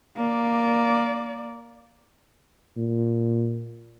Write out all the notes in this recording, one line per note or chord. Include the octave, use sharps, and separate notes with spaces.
A#3 D5
A#2